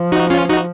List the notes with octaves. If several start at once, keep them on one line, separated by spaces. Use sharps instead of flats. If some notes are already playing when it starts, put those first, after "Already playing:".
Already playing: F3
D#4 F#4
C#4 F4
D#4 F#4